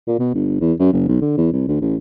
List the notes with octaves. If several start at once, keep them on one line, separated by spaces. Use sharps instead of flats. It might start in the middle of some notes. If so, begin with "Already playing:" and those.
A#2
B2
G1
E2
F#2
F#1
B1
D3
E2
C2
D2
A1